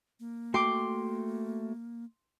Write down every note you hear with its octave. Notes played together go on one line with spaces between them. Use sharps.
A#3
A3 F#4 G5 C6 D6